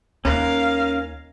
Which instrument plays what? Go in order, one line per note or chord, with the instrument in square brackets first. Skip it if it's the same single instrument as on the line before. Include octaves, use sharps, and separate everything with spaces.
[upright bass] D#2 [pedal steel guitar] C#4 A#4 F#6 [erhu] F5